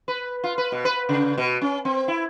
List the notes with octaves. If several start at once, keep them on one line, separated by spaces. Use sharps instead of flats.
B4
F4
B4
B2
B4
C#3
B2
C#4
C4
E4